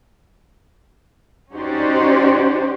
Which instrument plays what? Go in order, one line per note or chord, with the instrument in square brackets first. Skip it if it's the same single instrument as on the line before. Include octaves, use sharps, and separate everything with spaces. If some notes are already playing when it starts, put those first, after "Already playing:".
[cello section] C#4 D#4 F#4 G4 C5 D5